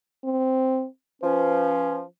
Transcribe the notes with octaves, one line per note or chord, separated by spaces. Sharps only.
C4
F3 C#4 B4